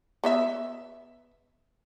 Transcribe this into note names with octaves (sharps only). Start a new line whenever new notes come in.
B3 D#5 E5